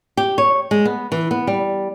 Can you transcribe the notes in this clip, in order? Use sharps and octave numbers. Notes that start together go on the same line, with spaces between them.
G4
C#5
G#3
B3
E3
B3
G3